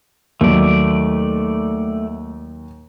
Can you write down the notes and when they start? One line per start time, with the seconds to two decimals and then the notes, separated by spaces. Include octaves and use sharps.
0.41 D#2 F#3 A3 D5